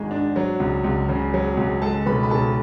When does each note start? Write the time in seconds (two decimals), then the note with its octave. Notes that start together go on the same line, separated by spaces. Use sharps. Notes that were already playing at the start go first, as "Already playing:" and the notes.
Already playing: G#1 G#2 G#3 G#4
0.11 D4
0.36 F#3
0.60 C#2
0.84 C#2
1.09 C#3
1.34 F#3
1.57 C#2
1.82 G#3 A4 A5
2.06 B1 B4 B5
2.23 B5
2.30 B1 A4 A5